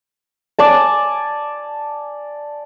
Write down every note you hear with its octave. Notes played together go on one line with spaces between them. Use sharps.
D5 G#5 A5